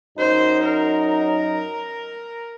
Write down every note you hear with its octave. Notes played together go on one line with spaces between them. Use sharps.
F#2 F#3 D#4 C5
A#4